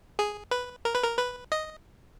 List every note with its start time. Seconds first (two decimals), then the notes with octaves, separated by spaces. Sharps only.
0.19 G#4
0.51 B4
0.85 A#4
0.95 B4
1.03 A#4
1.18 B4
1.52 D#5